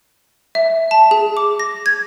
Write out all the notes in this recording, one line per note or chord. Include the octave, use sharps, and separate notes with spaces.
E5
A5
G#4
D6
A#6
G#6